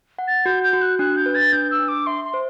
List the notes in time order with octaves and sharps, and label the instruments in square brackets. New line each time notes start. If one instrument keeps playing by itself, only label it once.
[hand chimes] F#5
[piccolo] A6
[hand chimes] F#4 [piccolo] G6
[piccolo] G6
[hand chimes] F#4
[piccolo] F#6
[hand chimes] D4 [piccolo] F#6
[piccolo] G6
[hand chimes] B4
[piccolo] A6
[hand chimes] D4 [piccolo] G6
[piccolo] E6
[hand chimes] D4
[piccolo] D6
[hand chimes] E5 [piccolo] C6
[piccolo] C6
[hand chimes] C5